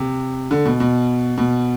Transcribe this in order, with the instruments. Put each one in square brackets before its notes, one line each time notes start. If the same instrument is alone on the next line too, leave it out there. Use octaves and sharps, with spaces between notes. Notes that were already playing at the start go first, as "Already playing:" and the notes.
Already playing: [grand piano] C3
D3
B2
B2
B2